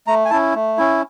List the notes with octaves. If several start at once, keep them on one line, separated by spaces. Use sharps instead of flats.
A3 A#5
G#5
C#4 E4 A5
A3
C#4 E4